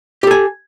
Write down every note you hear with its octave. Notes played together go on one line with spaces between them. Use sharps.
G4 A4 G#5